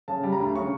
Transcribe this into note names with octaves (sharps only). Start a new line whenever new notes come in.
C#3 A5
G3
A#5
D2
C#3 C#6